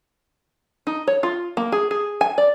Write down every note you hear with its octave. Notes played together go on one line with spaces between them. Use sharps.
D#4
C#5
F4
A#3
G#4
G#4
G#5
D5